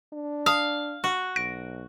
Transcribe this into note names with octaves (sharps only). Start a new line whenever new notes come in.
D4
F5 A5 D#6
F#4
B1 F#6 A#6 D7